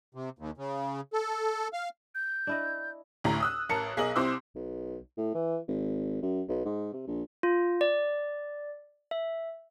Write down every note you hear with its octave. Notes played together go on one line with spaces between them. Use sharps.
C3
D#2
C#3
A4
F5
G6
D4 E4 D#5
A1 D2 A2 A#5
D#6 E6 F#6
A1 A#4 A5 C#7
B1 G#4 A#4 D#5 D#6 F#7
C2 C4 E4 C6 D6 E6
B1
A2
E3
G#1
F#2
B1
G#2
C3
A#1
F4
D5
E5